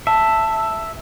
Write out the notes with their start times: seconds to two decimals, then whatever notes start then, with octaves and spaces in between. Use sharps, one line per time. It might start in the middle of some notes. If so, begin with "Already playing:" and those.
0.07 E5 A5